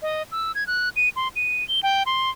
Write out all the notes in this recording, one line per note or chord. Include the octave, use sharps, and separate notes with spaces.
D#5
E6
G#6
F#6
D#7
C6
D#7
G7
G5
C6